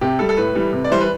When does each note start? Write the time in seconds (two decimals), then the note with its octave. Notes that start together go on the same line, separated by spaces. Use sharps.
0.01 C3 G4
0.19 G3 A4
0.29 A4
0.37 A2 B4
0.55 E3 G3
0.73 C3
0.84 D5
0.90 E3 G3 C5
1.01 B4